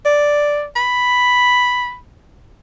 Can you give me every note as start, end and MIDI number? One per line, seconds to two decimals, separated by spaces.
0.05 0.65 74
0.76 1.96 83